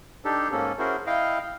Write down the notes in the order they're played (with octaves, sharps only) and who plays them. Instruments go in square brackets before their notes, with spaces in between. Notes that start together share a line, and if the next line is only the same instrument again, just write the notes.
[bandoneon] D4 D#4 G4 A4
G#2 A#3 C#4 A4
C#4 E4 F#4 G#4 A#4 C5
E4 D#5 F5 G5